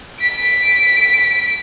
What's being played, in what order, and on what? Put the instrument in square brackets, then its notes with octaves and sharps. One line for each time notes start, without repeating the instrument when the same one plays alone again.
[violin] B6 D7